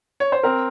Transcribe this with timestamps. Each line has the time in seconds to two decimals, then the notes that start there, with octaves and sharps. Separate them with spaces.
0.20 C#5
0.32 C5
0.43 C4 A#4